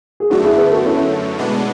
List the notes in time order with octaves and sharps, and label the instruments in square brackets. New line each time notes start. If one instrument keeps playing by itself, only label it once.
[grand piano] G#4
[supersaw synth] F#2 D3 A3 [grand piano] D4 F#4
[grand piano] E4 G#4
G#4 B4
F#4 A4
C#4 E4
[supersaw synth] B2 G#3 B3 D4